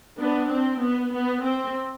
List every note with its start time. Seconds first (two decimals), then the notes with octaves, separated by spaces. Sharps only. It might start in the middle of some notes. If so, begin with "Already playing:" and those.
0.18 B3 D4
0.49 C4
0.80 B3
1.12 B3
1.43 C4